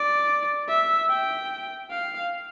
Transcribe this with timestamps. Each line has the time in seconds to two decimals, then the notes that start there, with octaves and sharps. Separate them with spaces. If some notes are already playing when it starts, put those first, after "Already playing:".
Already playing: D5
0.69 E5
1.10 G5
1.91 F5